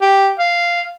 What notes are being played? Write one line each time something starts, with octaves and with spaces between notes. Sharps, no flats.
G4
F5